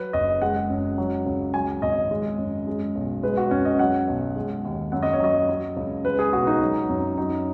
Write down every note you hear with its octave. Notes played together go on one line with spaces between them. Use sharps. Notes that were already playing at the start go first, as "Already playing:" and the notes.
Already playing: F#3 B4
F#1 D#5
G#3 F#5
F#2
F#3
C#2
F#3 G#5
G#1 D#5
G#3
F#2
G#3
B1
G#3 B4
F#4
F#2 C#4
D#5
F#3 F#5
B1
G#3
D#2
F#2 F#5
D#5
C#5
F#3 D#5
F#3
C#2
G#3 B4
G#4
B1 F#4
D#4
F#3
F#2
F#3 D#4